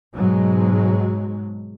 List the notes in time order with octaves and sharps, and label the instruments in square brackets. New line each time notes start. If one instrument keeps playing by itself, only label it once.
[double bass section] G#2 B2 F#3 G#3